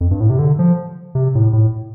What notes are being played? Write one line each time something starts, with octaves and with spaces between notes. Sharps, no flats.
F2
G2
A2
C3
D3
F3
C3
A2
A2